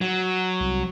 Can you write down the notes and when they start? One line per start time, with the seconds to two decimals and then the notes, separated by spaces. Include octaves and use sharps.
0.01 F#3
0.60 C2